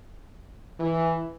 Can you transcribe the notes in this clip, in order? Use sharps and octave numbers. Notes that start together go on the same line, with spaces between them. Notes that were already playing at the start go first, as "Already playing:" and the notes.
E3